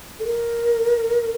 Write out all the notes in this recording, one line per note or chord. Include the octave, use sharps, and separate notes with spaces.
A4
A#4